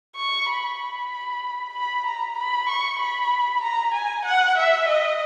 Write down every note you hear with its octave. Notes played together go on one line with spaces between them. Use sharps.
C#6
B5
B5
B5
A#5
B5
C#6
B5
A#5
G#5
F#5
E5
D#5